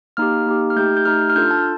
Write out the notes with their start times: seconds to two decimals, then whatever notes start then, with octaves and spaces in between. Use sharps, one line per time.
0.17 A#3 D#4 G4 F6
0.46 A#3 D#4 G4
0.70 F6
0.76 A3 D#4 G4 G6
0.97 G6
1.05 A3 D#4 G4 F6
1.30 F6
1.36 D4 F4 A4 G6
1.51 A5